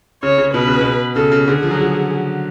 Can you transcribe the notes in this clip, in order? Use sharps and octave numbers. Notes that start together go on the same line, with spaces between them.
C#3 C#5
C#3
B2 B4
C#3
B2
C#3 A4
C#3
D3 G#4
F3
F#3
F3